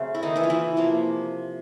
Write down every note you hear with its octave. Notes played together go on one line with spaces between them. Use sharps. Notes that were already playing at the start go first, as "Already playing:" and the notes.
Already playing: C#3 F#3 A3 C4
E4
D#3 D#4
E3 E4
F4
E3 E4
C3 F3 A#3